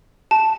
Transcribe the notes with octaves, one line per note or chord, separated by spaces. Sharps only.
A5